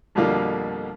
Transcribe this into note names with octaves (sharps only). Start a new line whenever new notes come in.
F2 B2 D3 G3 A#3 F4